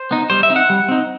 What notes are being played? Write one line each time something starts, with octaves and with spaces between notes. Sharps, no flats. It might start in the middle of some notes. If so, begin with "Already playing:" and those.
Already playing: C5
B3 D#4
G3 C5
E5
C4 D#4
F#5
G3
C4 D#4